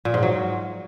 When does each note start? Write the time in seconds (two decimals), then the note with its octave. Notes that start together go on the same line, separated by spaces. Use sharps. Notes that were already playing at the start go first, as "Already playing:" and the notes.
0.05 A#2
0.14 G#2
0.23 F#3